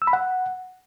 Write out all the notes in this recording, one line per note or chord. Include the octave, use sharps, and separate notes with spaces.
E6
B5
F#5